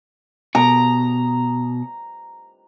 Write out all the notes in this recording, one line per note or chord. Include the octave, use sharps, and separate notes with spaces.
B2 A#5